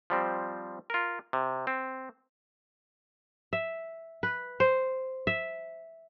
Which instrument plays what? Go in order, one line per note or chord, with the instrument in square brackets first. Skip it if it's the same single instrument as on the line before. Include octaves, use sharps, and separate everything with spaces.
[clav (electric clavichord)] F3 G3 C4
F4 A#4
C3
C4
[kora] E5
B4
C5
E5